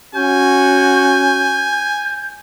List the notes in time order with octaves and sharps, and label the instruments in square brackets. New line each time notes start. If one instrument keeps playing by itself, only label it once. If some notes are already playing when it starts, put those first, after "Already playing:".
[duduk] C#4 [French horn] F#4 [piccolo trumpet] G#5 [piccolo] G6